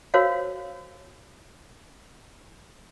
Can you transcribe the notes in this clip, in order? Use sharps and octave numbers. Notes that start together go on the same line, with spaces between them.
F#4 A#4 C5 C#5 F5